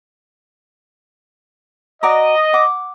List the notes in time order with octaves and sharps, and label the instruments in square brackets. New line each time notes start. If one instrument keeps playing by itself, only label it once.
[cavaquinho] F#4 D5 A#5 [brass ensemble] D#5
[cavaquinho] F#5 D6